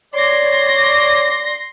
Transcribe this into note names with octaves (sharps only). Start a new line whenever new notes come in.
C#5 D5 C6 A#6